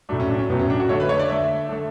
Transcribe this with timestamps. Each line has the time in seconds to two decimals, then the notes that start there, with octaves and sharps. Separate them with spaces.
0.09 A2 F#3 A3 D4
0.20 C#4
0.29 D4
0.39 C#4
0.50 A2 F#3 A3 B3
0.59 C#4
0.70 D4
0.80 F#4
0.89 D3 A3 C#5
1.00 B4
1.09 C#5
1.19 D5
1.30 D3 A3 E5
1.69 D3 A3